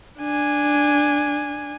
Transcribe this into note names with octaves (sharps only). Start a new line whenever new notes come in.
D4 G#5